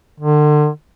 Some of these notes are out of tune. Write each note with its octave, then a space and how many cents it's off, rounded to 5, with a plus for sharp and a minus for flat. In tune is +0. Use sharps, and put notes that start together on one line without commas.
D3 +35